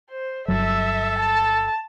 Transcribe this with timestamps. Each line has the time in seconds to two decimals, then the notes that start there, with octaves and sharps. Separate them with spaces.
0.11 C5
0.48 G1 G2 F#3 A4 E5
1.19 A5